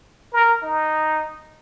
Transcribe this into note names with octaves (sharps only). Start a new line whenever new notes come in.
A#4
D#4